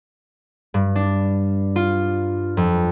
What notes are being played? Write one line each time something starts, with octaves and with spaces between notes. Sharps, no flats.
G2
D4
F4
F2